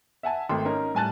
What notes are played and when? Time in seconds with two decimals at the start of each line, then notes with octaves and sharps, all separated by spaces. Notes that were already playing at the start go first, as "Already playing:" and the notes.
0.23 E5 F#5 G#5 A5
0.49 G#1 A3 G5 C6
0.65 C#4 D#4 A#4
0.94 A2 G3 G#5 A5 F#6 A6